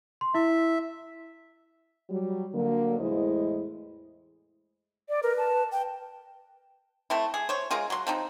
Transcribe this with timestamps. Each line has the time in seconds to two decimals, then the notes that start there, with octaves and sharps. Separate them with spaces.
0.21 C6
0.35 E4 E5
2.10 F#3 G3
2.54 D3 F#3 A#3
3.00 E2 A2 G#3 E4 C5 D#5
5.09 D5
5.23 A#4 B4
5.38 A5
5.72 G5
7.10 A3 C4 E4
7.34 G#4
7.49 C5 C#5
7.70 G#3 F4 G#4 A#4
7.90 F#3 C6
8.07 F3 C4 D#4